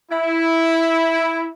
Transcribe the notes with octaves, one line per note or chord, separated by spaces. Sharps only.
E4